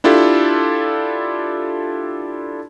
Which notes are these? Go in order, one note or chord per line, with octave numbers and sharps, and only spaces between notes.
D4 E4 F4 G4 A4